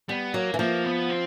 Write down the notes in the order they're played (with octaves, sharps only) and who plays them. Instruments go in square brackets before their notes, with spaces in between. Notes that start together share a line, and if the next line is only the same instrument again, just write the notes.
[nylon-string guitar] G3 [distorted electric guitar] B3
[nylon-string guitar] F#3 [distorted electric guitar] A#3
[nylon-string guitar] E3
[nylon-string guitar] F3 [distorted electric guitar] A#3
[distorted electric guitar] B3
C4